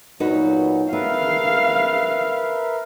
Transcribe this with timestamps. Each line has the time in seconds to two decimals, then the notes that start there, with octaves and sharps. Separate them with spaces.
0.20 A#2 F#3 B3 D#4 F#4 B4
0.93 B3 A#4 B4 E5 F5